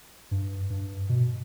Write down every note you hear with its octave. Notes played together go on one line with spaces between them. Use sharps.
G2
G2
B2